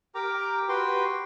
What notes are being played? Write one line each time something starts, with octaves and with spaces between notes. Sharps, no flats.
G4 A#4 G5 A#5 D6
F#4 G4 B4 G5 C6